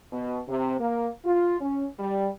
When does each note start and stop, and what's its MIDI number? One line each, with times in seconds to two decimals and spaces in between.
0.13 0.40 47
0.47 0.75 48
0.80 1.08 58
1.25 1.57 65
1.61 1.85 61
1.99 2.28 55